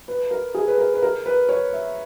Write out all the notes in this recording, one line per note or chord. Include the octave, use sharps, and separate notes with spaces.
B4
A#4
G#4
B4
A#4
B4
A#4
B4
C#5
E5